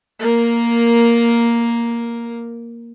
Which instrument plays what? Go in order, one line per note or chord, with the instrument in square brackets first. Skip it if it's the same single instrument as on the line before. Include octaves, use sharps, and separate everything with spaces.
[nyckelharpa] A#3 A#4